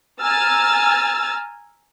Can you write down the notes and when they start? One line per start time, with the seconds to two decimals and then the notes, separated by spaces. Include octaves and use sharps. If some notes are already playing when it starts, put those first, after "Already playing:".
0.22 G#5 A#5 E6 F6 A6